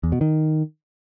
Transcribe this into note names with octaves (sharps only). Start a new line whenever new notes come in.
E2
B2
D#3